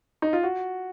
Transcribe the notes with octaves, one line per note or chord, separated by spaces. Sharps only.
D#4
F4
F#4